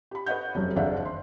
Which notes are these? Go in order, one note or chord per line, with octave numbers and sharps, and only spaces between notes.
G4 B5
B4 C#5 D#5 F#5 G6
F1 F#2 F#3 A4
F#1 D#2 D4 E5 F#5
C6